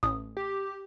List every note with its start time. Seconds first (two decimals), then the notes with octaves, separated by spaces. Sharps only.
0.03 A1 D#6
0.37 G4